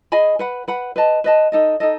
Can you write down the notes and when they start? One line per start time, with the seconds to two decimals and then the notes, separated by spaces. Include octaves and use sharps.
0.12 G#4 D#5 G#5 B5
0.39 B4 F#5 B5
0.68 B4 F#5 B5
0.96 B4 D#5 A5
1.24 B4 D#5 A5
1.52 D#4 A4 D#5
1.80 D#4 A4 D#5